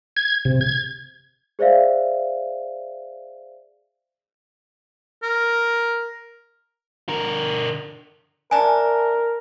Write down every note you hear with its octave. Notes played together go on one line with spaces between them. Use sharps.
G#6
C3
G#6
G#4 C5 D5 E5 F5
A#4
D3 A#4
A3 D4 A#4 G#5